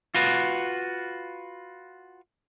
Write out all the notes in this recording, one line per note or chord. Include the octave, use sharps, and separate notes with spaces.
F4 F#4 B4